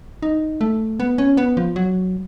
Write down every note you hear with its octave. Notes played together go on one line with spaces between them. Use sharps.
D#4
A3
B3
C#4
B3
F3
F#3